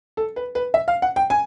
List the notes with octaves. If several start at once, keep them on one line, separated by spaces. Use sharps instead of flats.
A4
B4
B4
E5
F5
F#5
G5
G#5